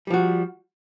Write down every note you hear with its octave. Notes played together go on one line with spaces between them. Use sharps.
F3 G3 F#4